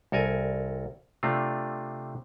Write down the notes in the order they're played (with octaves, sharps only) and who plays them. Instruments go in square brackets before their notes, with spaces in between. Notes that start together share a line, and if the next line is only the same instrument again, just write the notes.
[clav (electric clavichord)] C2 A4 A#4 G#5
C3 A3 C4 D4 F4